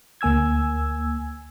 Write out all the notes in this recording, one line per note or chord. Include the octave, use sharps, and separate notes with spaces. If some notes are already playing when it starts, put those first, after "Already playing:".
D2 A#3 G#5 E6 G#6